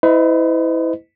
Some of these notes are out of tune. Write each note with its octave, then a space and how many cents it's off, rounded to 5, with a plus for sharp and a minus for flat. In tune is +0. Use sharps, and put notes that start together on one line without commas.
E4 -15 B4 +45 D#5 +0